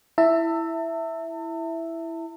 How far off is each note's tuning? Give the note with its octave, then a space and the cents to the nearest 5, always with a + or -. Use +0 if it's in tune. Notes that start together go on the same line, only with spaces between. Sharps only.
E4 +0 E5 +0 A5 +40